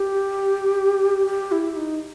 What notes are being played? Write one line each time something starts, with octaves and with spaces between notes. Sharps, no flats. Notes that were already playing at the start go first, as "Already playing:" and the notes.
Already playing: G4
G4
E4
D#4